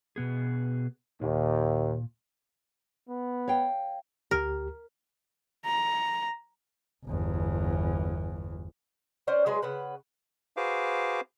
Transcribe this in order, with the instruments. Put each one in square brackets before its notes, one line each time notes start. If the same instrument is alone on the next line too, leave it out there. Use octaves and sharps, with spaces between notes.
[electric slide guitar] B2 B3 G#4
[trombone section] D#2 [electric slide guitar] A#2
[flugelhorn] B3
[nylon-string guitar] C#5 F5 G5
[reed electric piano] D2 G4 [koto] A#4
[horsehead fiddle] A#5
[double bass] G1 E2
[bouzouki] C#4 C5 D5 F#5
F#3 G#3 G#4 B4
C#3 B4 F#5
[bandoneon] F#4 G#4 B4 C5 F5 D6